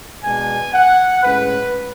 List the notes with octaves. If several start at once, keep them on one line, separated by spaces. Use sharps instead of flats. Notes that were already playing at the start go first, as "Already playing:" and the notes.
B2 G#3 B3 D4 G#5
F#5
A2 G#3 C#4 B4